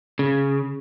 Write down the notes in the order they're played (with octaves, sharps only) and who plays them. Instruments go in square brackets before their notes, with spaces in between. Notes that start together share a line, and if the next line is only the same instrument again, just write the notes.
[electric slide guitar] C#3